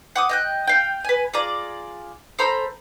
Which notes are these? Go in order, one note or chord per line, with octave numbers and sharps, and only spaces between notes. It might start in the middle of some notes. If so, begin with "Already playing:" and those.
F#5 D6 D#6
D#5 G5 F#6
F5 G5
B4 G#5
F4 G#4 D5 A#5
A4 C5 A#5 B5